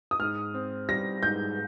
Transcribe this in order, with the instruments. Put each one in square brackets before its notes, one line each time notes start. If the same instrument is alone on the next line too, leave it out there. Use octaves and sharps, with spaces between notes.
[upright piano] D#6
[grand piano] G#2 [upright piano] F6
[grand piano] C4
[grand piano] G3 [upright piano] A#6
[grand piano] G#2 [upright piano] G6